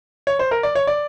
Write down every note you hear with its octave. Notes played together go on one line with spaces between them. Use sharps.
C#5
C5
A#4
D5
C#5
D5